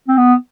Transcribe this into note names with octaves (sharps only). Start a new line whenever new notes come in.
C4
B3